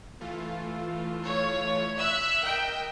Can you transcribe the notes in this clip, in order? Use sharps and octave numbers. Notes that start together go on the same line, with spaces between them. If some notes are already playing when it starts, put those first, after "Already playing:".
E3 A3 F4
C#5
E5 E6 F#6
A#4 D#5 G5